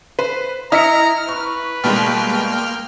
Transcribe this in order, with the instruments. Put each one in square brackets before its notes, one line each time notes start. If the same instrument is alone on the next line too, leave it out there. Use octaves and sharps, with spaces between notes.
[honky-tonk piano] B4 [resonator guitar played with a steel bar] C5
[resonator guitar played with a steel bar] E4 [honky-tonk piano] D#5 B6 C#7 [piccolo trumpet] A#5 [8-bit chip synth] F6
[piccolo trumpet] B4 [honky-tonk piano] C#6
[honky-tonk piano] B2 G3 G#3 [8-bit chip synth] A#3 G5 F6